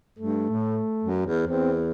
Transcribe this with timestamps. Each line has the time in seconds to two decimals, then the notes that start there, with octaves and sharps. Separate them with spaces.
0.19 G2 A3
0.50 A2
1.04 F#2
1.26 E2
1.47 E2 C4